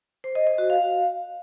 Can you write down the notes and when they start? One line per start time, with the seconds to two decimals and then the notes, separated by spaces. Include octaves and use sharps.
0.24 C5
0.35 D#5
0.47 D#5
0.58 F#4
0.70 F5